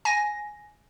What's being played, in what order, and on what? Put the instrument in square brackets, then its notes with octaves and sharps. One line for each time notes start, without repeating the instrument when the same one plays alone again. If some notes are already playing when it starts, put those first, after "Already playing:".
[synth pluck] G#5 A#6